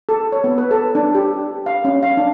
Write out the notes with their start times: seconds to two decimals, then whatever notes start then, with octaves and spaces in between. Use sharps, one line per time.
0.09 A4
0.32 C#5
0.44 B3
0.58 B4
0.71 A4
0.95 D4
1.15 G4
1.66 F5
1.85 C#4
2.03 F5
2.17 D4